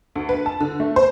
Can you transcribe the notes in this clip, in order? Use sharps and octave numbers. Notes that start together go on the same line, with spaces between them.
D2
B4
A5
D3
A3
C5